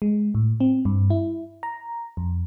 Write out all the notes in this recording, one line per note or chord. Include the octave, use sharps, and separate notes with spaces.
G#3
A2
C4
G2
E4
A#5
F2